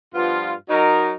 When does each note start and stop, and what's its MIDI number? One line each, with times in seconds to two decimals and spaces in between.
0.15 0.52 43
0.15 0.52 53
0.15 0.52 59
0.15 0.52 65
0.70 1.14 54
0.70 1.14 63
0.70 1.14 70